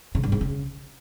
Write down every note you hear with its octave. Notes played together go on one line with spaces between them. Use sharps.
C#3
G2
G#2
C#3